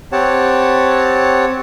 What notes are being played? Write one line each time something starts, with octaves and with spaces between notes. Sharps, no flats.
C4 G4 C#5 F#5 A5